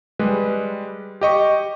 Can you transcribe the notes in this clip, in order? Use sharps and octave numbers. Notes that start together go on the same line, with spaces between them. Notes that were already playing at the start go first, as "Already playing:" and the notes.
G3 G#3 B4
G4 D#5 C#6